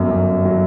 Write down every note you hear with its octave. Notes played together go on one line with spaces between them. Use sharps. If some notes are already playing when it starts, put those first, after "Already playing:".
Already playing: G1 F#2
F#2
F#3